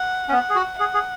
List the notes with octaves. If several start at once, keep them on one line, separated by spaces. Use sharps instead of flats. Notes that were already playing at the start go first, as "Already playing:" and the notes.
Already playing: F#5
C#4
B3 F#5
G#4
F#4
G#4 F#5
G#4